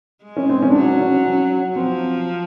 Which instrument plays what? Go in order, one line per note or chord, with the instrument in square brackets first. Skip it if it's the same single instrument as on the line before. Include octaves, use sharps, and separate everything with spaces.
[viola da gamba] G#3
[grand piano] C#4
C4
C#4
D4
[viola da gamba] F#3 [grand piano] C#4
[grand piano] C#4
C#4
[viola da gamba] F3 [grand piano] C4